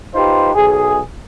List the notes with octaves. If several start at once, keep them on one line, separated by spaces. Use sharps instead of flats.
D#4 F4 G4 B4 C5
B1 G#4